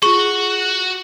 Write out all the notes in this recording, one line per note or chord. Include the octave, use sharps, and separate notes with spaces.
F4 F#4 G#4 C#6